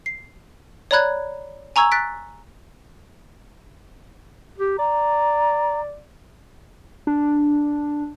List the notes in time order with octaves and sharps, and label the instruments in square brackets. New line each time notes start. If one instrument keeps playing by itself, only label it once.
[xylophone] C7
C#5 D5 A#5 B5 F#6 G#6
G#5 A#5 C#6 E6 G#6 F7
F#6 A6 B6 D7
[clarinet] G4
[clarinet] D5 [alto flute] A#5
[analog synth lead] D4